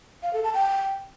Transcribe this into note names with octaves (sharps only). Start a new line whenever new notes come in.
F5
A4
A5
G5